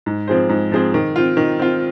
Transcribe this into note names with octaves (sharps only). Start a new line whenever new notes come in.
G#2
F3 C4 G#4 C5
G#2
F3 C4 G#4 C5
D#3
C4 F4
D#3
C4 F4